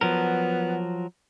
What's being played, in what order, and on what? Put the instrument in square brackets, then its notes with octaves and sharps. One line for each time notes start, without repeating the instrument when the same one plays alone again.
[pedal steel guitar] F3 F#3 A#4 [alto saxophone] B3